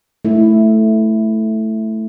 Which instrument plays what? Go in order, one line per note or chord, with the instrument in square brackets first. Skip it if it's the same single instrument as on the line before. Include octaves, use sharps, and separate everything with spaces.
[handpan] A3 E4